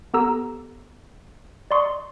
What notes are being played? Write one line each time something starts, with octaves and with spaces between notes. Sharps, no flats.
B3 G4 A4 A#5 E6
D5 D#5 C6 C#6 D#6